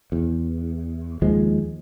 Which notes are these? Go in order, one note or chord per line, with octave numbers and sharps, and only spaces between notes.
E2
D#2 F3 G#3